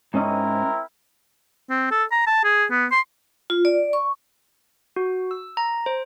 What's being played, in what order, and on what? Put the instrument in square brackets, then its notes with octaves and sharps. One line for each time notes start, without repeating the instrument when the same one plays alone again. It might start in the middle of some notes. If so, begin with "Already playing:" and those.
[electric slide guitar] G#2 C#4 D#5 [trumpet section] C4 E4 A#4
[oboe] C4
A4
A#5
A5
G#4
B3
C6
[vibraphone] F4
D5
C#6
[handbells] F#4
E6
A#5
C5